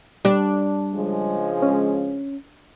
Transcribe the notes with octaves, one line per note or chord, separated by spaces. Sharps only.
G3 D4
C#3 F3 G#3
C#4